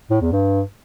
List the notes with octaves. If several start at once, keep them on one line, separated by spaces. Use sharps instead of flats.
A2
E2
G2